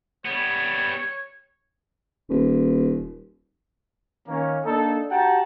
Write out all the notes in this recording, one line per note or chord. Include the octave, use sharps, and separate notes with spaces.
G3 B3 C#5
D#1
D#3 A#3 C#4
A#3 D4 D#4 A4
F#4 G4 F#5 G5 A5 A#5